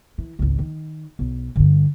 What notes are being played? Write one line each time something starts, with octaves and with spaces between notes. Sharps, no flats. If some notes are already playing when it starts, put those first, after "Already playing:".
E3
G#1 C#2
D#3
B1
G2 D3